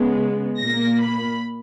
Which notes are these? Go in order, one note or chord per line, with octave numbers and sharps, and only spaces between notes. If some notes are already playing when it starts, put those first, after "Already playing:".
Already playing: C#3 G#3 B3
A#2 A#3 A#6
B5